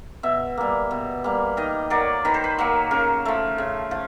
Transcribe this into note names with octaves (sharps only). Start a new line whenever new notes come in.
B2 E5
G3 A#3
B2
G3 A#3
D#3 D#5
F#3 A#3 D5
D#3 B4
C5
B4
F#3 A#3
C#3 A#4
F3 A3
C#3
F3